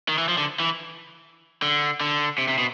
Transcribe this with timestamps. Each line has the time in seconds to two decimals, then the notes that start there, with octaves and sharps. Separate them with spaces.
0.09 D#3
0.18 E3
0.29 F3
0.38 D3
0.60 E3
1.62 D3
2.01 D3
2.38 C3
2.48 C3
2.58 B2